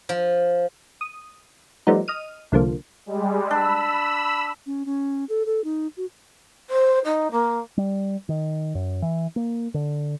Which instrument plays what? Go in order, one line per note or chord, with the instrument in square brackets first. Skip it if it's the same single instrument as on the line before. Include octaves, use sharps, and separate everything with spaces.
[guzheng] F3
[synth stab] D#6
F3 G3 A3 B3 D#4
D#5 F6 D#7
C2 D3 F3 A#3
[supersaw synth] G3 G#3
[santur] D4 [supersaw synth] B5 E6
[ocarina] C#4
C#4
A4
A4
D#4
F#4
[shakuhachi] C5
D#4
A#3
[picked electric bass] G3
D#3
F#2
E3
A#3
D3